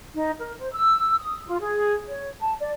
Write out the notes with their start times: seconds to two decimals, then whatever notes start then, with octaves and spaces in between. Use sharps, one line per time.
0.15 D#4
0.40 A#4
0.58 C5
0.72 E6
1.19 D#6
1.47 F4
1.61 G#4
2.09 C#5
2.40 A5
2.61 D5